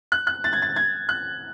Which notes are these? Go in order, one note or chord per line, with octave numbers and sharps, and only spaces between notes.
F#6
F#6
A6
G#6
A6
G#6
F#6